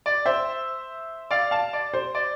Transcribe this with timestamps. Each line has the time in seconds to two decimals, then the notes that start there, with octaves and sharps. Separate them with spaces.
0.06 D5
0.26 C5 E5
1.31 D5 F5
1.51 F5 A5
1.73 D5
1.94 C5
2.15 D5